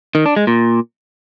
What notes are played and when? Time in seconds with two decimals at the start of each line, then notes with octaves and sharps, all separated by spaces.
0.15 D#3
0.26 D4
0.36 G#3
0.47 A#2